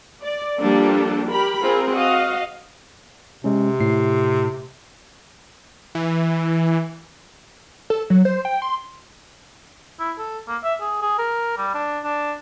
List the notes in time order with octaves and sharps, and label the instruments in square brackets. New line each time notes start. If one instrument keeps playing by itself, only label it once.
[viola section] D5
F3 G3 A#3 D4 G4 A4
G4 A#4 B5
C4 F4 G#4 A#4
F#4 D#5 F5
[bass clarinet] C3 [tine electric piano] G#3 C#4
[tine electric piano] A2 C7
[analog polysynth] E3
[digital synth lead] A4
F#3
C5
G5
C6
[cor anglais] E4
A4
A#3
E5
G#4
G#4
A#4
G3
D4
D4